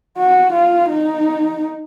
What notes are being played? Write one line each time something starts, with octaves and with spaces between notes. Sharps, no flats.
F#4
F4
D#4